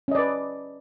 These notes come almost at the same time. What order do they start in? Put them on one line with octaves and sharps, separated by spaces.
C#4 D#5 D5 B4